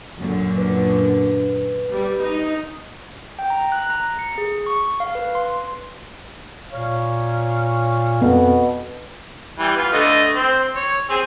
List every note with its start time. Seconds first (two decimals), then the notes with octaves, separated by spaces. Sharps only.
0.17 F#2 A#2 D3
0.57 B4
1.92 G3
2.23 D#4
3.39 G5
3.50 A#5
3.72 F#6
3.90 A#5
4.19 C#7
4.38 G#4
4.66 C#6
5.00 F5
5.15 B4
5.35 C6
6.72 A#2 C#5 F5
8.22 F2 B2 B3
9.59 E3 G3
9.77 B3 F4
9.93 D3 A3 D#5
10.34 C4
10.76 C#5
11.10 C4 G#4